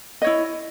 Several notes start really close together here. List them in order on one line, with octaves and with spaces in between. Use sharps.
D#5 C#5 E4